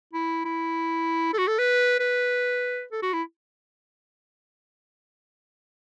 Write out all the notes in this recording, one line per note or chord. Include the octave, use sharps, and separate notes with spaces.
E4
E4
A4
F#4
A4
B4
B4
A4
F#4
E4